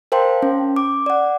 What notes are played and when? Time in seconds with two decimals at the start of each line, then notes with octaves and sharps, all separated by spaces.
0.12 A#4 C5 F5 G5 A5 C6
0.42 C#4
0.76 D6
1.06 D5 F#5